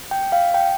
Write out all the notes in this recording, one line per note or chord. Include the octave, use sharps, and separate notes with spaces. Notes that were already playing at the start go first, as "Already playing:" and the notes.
G5
F5
G5